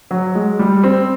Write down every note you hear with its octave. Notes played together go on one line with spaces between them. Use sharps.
F#3
G#3
G3
C4